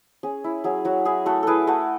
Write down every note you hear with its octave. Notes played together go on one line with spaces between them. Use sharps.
C#4 G#4
E4
F#3 G#4
F#3 F#4
E4 G#4
A3 F#4 A4
E4 G#4 A4 B4
A3 F#4 A4